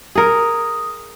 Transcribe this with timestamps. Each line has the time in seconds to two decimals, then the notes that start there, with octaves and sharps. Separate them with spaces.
0.15 G#4 A#4 D#6